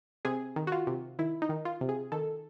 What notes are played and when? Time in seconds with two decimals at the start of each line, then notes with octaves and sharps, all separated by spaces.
0.25 C3 G#4
0.56 D#3
0.67 F#4
0.72 F4
0.87 C3
1.19 D#3 E4
1.42 D#4
1.49 D#3
1.65 F4
1.81 C3
1.89 G#4
2.12 D#3 A4